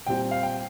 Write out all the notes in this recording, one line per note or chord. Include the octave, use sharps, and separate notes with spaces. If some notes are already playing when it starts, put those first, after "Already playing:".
A#2 G3 C4 G5
F5
G5